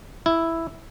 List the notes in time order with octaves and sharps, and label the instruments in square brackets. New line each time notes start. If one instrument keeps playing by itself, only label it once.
[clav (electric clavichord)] E4